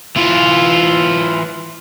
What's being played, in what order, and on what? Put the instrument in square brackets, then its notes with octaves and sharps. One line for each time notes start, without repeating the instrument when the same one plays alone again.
[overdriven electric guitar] E3 F4